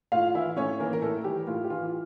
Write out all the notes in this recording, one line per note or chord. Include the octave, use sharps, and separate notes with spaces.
A2 F4 F5
E3 E4 E5
A2 C#4 C#5
E3 A#3 A#4
A#4
A2 A3 A4
E3 G3 G4
A2 F4
G4
E3 F4